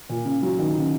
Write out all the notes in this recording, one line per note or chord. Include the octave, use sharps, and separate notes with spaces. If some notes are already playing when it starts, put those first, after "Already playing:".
A#2
C#3
F#3
D#3
C#3